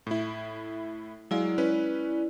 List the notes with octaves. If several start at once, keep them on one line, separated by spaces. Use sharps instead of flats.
A2 E4
F#3 G#3 E4 D5 F5
C#4 B4